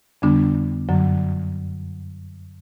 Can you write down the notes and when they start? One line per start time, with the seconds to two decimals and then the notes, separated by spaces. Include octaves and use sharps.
0.22 F2 D3 G3 B3 D4
0.89 F#2 D3 F#3